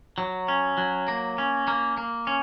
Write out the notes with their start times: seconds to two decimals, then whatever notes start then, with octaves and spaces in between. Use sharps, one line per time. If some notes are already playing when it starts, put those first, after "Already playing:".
0.18 F#3
0.48 C#4
0.78 F#3
1.08 A#3
1.38 C#4
1.68 A#3
1.97 A#3
2.27 C#4